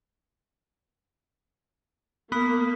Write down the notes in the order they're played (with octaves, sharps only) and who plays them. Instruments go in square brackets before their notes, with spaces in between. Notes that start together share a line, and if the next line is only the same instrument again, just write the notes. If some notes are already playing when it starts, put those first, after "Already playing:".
[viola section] A#3 [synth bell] B3 B5 D#6